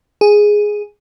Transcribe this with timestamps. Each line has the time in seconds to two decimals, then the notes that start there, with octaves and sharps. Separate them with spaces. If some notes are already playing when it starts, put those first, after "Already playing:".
0.21 G#4